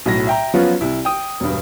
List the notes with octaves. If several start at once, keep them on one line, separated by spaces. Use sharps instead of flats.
B1 A2 F#3 A#6
E5 G5 A#5
F3 F#3 B3 C#4 F4 F#4
C2 E4
G5 D#6
E1 G2